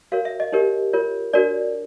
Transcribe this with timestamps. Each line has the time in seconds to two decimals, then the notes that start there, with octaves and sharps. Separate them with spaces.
0.12 F#4 A#4 C#5 F5
0.25 E5
0.40 D#5
0.52 D#4 G4 A#4 C#5
0.93 F4 A#4 C#5
1.33 D4 F#4 A#4 C#5 D5